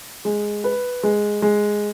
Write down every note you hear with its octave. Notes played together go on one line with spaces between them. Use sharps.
G#3
B4
G#3
G#3